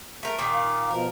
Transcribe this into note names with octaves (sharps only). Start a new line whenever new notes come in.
A3 A#4
A#2 D#3 D6
F5
B2 F3 A#4